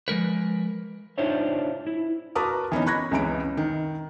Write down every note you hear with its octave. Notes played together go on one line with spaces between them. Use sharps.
F3 G#3 A#4 B4
D4 D#4 F4 C5 C#5 E5
E4
F#4 A#4 B4 A5 D6 D#6
E3 B3 C#4 D#4
B5 C#6 F#6 G#6 A#6
C#2 C#3 E3 B3 B5 D7
D#3